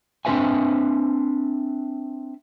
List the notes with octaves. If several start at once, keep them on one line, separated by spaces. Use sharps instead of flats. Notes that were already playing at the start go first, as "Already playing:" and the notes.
C4 D4 D#4 B4 E5 G#5